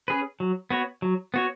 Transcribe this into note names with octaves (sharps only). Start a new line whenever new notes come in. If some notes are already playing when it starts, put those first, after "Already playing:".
C#4 G#4 B4
F#3
B3 F#4 C#5
F#3
B3 F#4 C#5